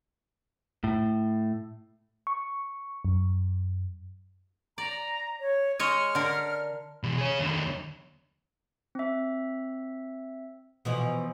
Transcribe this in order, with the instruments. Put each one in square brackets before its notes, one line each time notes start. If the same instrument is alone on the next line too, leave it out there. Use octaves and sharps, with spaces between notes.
[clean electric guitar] A2
[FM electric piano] C#6
F#2
[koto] D5 [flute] A#5
[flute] C#5
[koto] G#3 C#5 D#5 [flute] F6
[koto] D3 A#4
[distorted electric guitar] B2 E3
G#4 C#5
D#2 D3
[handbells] C4 E5
[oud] B2 E3 F3